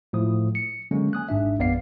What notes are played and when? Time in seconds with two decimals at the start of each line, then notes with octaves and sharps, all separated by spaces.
0.13 A2 F3 D#6
0.55 C#7
0.91 D3 F#3 G#3 A#3 C#4
1.13 G#5 D#6 F#6
1.29 G#1 G#2 D4 E5
1.59 A#1 F#2 B3 D5 F5 C7